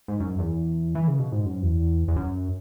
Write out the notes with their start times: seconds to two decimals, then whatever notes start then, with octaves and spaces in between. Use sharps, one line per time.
0.08 G#2
0.20 F#2
0.39 E2
0.95 E3
1.08 C#3
1.19 B2
1.32 G#2
1.45 F#2
1.63 E2
2.08 E2
2.16 F#2